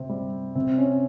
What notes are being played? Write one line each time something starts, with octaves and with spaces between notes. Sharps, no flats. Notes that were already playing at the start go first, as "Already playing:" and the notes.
Already playing: C3 C4
G3
C3 C4
C#4